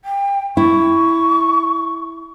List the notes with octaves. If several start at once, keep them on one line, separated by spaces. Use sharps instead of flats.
G5
E4 C#6